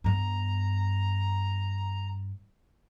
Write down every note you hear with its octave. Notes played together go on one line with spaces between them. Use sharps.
G2 B3 A#5